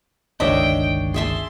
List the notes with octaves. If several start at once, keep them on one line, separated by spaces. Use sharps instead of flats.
G1 C#2 D#3 D4 C#5 D#5 E5 G5
G#4 E5 A5 C6